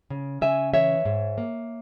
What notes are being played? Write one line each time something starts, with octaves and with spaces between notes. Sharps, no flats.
C#3
C#3 E5 G#5
E3 C#5 E5
G#2
A#3